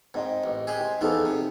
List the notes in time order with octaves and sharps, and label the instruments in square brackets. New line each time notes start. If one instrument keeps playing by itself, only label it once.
[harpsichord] G#2 [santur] C4 D#5 G5
[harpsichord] A1
G#3 G4 G#4
[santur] G5 C6
[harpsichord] E2 E3 F3 [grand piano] D#4 G#4 A4
[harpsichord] C3